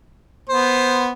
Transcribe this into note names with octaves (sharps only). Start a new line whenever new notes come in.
B3 C5